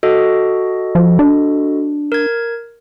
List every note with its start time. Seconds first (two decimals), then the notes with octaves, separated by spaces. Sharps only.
0.03 F#4 A4 D#5
0.95 F3
1.19 D4
2.12 A#4 G#6